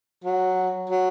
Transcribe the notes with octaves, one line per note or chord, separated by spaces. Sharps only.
F#3
F#3